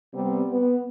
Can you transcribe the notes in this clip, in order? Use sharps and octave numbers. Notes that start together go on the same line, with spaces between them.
C3 G3 B3 C4
B3